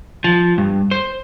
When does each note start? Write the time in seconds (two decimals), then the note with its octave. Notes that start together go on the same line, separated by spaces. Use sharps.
0.24 F3
0.58 G2
0.91 C5